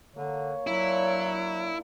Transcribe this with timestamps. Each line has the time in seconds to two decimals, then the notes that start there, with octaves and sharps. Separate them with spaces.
0.16 D3 A#3 C#5 A#5
0.67 F#3 D4 E4 F4 A#4